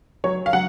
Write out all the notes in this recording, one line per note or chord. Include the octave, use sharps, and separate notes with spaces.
F#3 C#5
F5
F#3 F#5